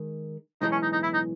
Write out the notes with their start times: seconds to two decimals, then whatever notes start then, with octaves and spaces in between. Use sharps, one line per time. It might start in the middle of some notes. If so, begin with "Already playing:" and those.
Already playing: D#3 G#3
0.61 B1 A2 E3 G#3 D#4
0.72 C#4
0.82 D#4
0.93 D#4
1.03 E4
1.14 D#4